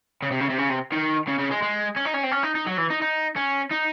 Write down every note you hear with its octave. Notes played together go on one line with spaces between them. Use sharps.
C#3
C3
C#3
C3
C#3
C3
D#3
C#3
C#3
G#3
G#3
C#4
D#4
C#4
C4
C#4
D#4
D#4
F#3
E3
D#4
D#4
C#4
D#4